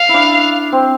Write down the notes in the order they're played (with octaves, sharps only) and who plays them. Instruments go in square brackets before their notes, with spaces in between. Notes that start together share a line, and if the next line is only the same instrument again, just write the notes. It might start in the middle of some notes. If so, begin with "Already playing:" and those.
Already playing: [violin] F5
[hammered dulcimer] E4
D4
C4